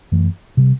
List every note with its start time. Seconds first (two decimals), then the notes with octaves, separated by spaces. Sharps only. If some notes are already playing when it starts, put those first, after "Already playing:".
0.12 F#2 E3 A3
0.57 C3 G3